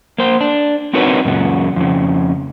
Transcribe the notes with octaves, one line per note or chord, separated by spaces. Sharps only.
A#3 C5
D4
C4 D#4 F#4 A#4 B4 C#5
F#2 A#2 C#3 F#3
F2 C#3